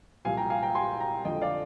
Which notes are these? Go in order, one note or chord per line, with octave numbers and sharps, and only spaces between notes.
C2 A#2 F3 F5 G#5
G5 A#5
F5 G#5
G5 A#5
G#5 C6
G5 A#5
F2 D3 F3 D#5 G5
D5 F5